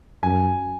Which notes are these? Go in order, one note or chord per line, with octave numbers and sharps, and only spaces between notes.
F#2 G#5